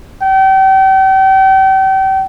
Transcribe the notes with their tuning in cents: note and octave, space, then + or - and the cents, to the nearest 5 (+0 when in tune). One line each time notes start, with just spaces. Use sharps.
G5 -35